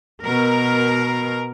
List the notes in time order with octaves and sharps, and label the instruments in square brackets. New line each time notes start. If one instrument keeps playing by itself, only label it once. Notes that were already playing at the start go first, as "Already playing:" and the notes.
[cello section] B2 A#4